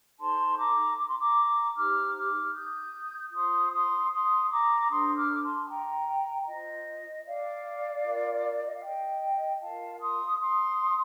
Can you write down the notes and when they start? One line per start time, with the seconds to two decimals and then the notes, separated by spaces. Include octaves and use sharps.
0.19 D#4 A4 C5 A5 C6
0.57 A#5 D6
0.97 D6
1.08 C6
1.19 A#5 D6
1.75 D#4 G4 C5 D6 F6
2.14 D6 F6
2.54 D#6 G6
3.32 F4 C5 C6 D#6
3.72 C6 D#6
4.11 C6 D#6
4.50 A#5 D6
4.90 D4 A4 C5 C6 D#6
5.16 D6 F6
5.32 D6
5.41 A5 C6
5.68 G5 A#5
6.47 F4 C5 D#5
7.25 D5 F5
8.04 F4 A#4
8.66 D#5
8.74 F5
8.82 D#5 G5
9.60 F4 A#4 F5 A5
10.00 C6 D#6
10.39 C6 D#6